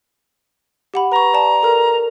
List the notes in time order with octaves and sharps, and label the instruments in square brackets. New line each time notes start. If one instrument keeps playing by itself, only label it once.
[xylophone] G4 F#5 B5
[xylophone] B4 C#6 [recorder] A#5
[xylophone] D5 A5
A4 A#4